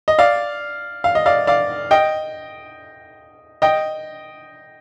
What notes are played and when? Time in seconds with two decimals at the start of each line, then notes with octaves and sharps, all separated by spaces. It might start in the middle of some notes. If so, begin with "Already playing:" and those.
0.08 D#5
0.19 D5 F5
1.04 F5
1.15 D#5
1.26 D5 F5
1.47 D5 F5
1.91 D#5 G5
3.62 D#5 G5